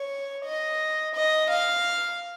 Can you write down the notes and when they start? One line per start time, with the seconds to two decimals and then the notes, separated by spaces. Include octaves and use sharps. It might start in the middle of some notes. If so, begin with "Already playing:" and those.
Already playing: C#5
0.45 D#5
1.15 D#5
1.50 F5